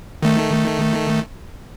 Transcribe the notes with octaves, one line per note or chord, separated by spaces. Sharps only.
D#3 A3